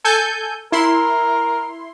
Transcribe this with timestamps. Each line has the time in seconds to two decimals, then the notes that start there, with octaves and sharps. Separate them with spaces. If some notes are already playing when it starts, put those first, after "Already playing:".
0.04 A4 G#5 G6
0.72 E4 A#4 C6